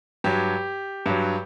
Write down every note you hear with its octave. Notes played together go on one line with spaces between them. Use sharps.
G2 F#3 G4
G2 F#3